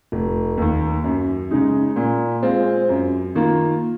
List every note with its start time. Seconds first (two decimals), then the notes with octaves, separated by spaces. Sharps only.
0.12 F1
0.57 D#2 D#3
1.04 F#2
1.51 C#3 G#3 D#4
1.96 A#2
2.42 G#3 C4 F4
2.89 F#2
3.35 D#3 A#3 F4